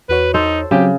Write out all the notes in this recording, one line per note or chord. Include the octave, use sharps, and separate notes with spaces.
E2 F#4 B4 C#5
D#4 A4 C5
C#3 F#3 C4 G4